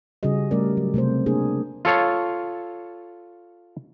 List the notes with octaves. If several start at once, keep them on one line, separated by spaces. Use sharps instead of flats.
C#3 G3 F#4 G#4 D#5
G3 A3 C#4 A#4 D5
F#3
C3 A3 C4 C5
A#3 D4 G#4 A#4
F4 A4 C#5 F5